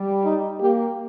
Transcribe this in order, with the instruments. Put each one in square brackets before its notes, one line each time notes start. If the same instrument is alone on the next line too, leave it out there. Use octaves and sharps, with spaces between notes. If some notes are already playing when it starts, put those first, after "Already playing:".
Already playing: [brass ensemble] G3
[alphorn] D#4
[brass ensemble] A#3 [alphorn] G4